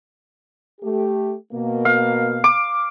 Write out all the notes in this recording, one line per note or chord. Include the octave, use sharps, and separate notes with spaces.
A3 G4
B2 A#3
F5
D6